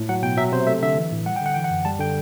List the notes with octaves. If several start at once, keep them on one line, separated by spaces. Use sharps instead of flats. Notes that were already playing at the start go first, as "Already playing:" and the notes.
Already playing: A2
F#3 F#5
B2 G5
F#3 E5
C3 C5
A3 E5
D3 E5
E3
A2
G3 F#5
G5
D3 F#5
E3 G5
F#5
F#2
G3 A5
D3 G5